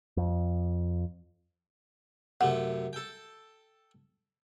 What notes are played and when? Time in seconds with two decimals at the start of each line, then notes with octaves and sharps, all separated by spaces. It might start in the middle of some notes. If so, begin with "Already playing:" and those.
0.17 F2
2.41 F#2 C3 A3 F#5
2.93 A4 G5